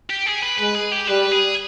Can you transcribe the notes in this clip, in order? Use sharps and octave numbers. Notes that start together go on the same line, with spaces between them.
G4
G#4
B4
G#3 B4
G#4
G4
G3 B4
G#4